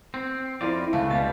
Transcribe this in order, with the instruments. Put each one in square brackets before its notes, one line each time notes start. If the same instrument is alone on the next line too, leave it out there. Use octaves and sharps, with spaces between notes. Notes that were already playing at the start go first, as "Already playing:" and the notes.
[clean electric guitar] C4
[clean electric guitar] F2 F4 D5 [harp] C4 A#4 [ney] E4
[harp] C#2 [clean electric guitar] A3 [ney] F5
[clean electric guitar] B2 G3 [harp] A6